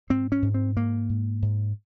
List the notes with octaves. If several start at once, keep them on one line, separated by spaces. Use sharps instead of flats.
G#2 C4
C#4
G#2
C4
G#2 A#3
G#2
G#2